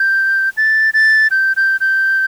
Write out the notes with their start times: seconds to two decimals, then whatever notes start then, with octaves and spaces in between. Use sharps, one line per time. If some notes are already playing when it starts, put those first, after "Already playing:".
Already playing: G6
0.57 A6
0.94 A6
1.31 G6
1.57 G6
1.81 G6